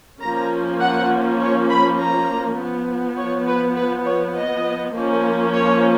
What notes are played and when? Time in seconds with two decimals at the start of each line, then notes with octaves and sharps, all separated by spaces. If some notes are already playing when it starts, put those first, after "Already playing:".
0.21 F3 A#3 C#4 A#5
0.80 F#5
1.40 C#5
1.70 B5
1.99 A#5
2.57 F3 B3
3.17 C#5
3.47 B4
3.76 B4
4.05 C#5
4.36 D#5
4.94 F3 A#3 C#4
5.53 C#5